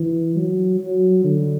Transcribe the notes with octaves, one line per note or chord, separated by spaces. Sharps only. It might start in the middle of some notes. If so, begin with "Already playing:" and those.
Already playing: E3
F#3
F#3
D3